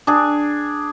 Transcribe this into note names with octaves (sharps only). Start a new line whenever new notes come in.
D4 G#4